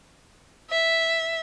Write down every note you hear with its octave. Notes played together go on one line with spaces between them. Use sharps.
E5